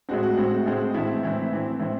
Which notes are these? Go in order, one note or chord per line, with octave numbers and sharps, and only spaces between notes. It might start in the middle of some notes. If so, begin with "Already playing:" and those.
A2 G#3 C4 F#4
F#4
A2 G#3 C4
A2 G#3 C4
A2 E3 C4 E4
A2 E3 C4
A2 E3 C4
A2 E3 C4